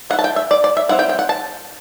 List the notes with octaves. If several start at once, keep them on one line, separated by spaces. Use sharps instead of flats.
A3 E4 F#5
A5
G5
E5
D5
D5
E5
G3 C4 E4 F#5
G5
G5
F#5
A5